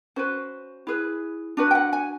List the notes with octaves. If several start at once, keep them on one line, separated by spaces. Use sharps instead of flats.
C#4 F#4 B4 C5
E4 G#4 B4
D4 F#4 B4
G5
F#5
G#5